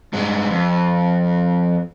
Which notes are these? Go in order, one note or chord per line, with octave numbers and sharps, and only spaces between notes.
G2 G#3
F2